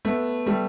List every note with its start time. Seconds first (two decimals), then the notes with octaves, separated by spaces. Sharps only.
0.05 A3 B3
0.46 G3 A3